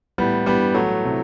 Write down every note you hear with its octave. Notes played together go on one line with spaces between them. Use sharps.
A2 E3 G3 B3
G2 E3 G3 B3
A2 E3 F#3 A3
C3 E3